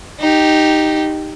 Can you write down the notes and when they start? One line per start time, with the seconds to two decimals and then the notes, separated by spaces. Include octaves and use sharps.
0.20 D#4 G4